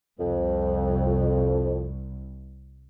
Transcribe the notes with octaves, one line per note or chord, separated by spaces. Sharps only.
C2 F2